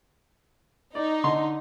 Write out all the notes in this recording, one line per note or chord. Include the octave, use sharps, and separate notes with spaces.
D#4 D5
D3 C6